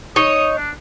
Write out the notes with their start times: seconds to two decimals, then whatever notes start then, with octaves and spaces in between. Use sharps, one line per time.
0.16 D#4 C#5 D#6
0.57 D4